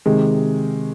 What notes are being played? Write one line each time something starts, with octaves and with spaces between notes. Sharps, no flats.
C3 D#3 G#3